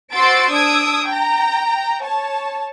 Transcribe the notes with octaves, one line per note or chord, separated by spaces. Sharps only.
F#4 C5 C6 E6 A6 D7
D4 D#6 E6 G#6 D7
G5 A#5
C#5 A5